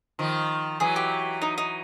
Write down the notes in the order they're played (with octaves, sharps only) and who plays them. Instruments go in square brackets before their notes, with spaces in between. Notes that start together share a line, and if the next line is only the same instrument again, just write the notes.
[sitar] D#3 F3
[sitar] E3 F#3 [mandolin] G#4
[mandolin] G4
D#4
D#4